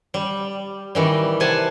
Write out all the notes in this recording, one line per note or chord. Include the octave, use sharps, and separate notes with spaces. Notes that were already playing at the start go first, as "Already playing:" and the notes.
G3
D#3 E3 G3
C3 F#5 G#5 A5